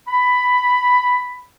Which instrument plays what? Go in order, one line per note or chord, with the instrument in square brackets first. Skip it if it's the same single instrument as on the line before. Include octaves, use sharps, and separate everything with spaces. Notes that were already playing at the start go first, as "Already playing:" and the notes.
[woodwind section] B5